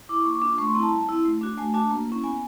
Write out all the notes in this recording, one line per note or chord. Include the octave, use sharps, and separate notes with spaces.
E4 D6
A#3 C#6
D6
D4 F4
A3 C#6
C6
C4 E4 A#5
A5
G3
C4 E4
A3
D4 F#4
A3 G#5
D4 F#4 A5
A#3
C#4 E4
B3 G#5